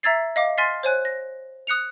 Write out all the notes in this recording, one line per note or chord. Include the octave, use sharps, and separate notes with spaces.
E5 A#5 E6 G#6 A6 C7
D#5 F5 D6
G#5 C6 F6 A6 B6 C7
C5 C#5 G#5 F#6
A#6
D#6 F#6 C#7 F7